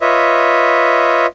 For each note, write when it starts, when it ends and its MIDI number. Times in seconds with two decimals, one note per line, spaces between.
0.01 1.26 65
0.01 1.26 71
0.01 1.26 73
0.01 1.26 75
0.01 1.26 76